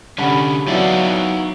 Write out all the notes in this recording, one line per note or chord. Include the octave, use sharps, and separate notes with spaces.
D3 G3 C#4 F#5 B5
F#3 B3 D#4 E4 D5 F5